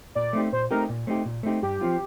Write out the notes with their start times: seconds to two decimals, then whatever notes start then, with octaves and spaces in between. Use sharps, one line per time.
0.15 A#2 D5
0.33 A3 C4 D#4 G4
0.53 A#2 C5
0.71 A3 C4 D#4 G4 A#4
0.89 A#2
1.07 A3 C4 D#4 G4
1.25 A#2
1.43 A3 C4 D#4 G4
1.62 G2 G4
1.81 F3 C4 F4